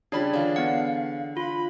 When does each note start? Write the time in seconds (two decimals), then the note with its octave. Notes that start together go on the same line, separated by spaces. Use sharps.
0.12 C#3 G3 D4 F4 D5 B5
0.34 D3 E3 G#3 D5 F5
0.56 B3 F#5
1.37 F4 B5